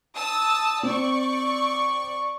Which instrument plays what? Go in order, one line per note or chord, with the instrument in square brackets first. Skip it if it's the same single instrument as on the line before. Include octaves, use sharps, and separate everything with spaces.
[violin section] A5 D#6 E6
[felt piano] C4 [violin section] D5 C#6